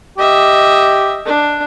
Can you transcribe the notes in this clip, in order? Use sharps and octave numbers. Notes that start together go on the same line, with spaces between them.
G4 D#5 E5
D4